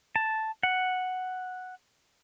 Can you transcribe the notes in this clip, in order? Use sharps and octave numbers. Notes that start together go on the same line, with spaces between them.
A5
F#5